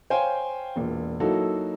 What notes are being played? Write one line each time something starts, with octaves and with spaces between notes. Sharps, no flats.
C5 C#5 F5 G5 G#5
E1 A#2
F#3 A#3 D#4 E4 F#4 A4